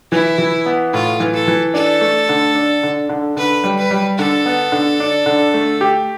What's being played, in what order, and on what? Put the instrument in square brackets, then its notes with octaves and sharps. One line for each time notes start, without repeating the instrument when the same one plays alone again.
[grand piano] E3 [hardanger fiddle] E4
[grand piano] E3
B3
[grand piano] A2 [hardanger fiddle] F4
[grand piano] E3
[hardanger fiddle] A4
[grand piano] E3
[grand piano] D4 [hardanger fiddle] A4
[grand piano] A3
D3
D4
D3
D3
[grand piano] D3 [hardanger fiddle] B4
[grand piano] G3
[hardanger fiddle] B4
[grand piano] G3
[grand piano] D3 [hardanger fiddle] A4
[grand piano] B3
D3
D4
D3
A3
G4